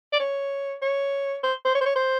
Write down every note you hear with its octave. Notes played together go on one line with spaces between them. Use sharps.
D5
C#5
C#5
C5
C5
C#5
C5
C#5
C5